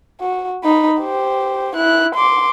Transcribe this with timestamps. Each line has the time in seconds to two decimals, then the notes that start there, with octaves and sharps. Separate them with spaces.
0.20 F#4
0.64 D#4 B5
1.01 G4 C5
1.76 E4 F#6
2.15 C6 D6